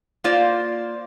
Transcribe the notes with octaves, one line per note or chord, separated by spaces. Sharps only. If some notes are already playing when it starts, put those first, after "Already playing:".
A#3 F4 C5 D5